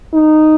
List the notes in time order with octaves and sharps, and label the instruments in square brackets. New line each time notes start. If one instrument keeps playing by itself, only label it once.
[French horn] D#4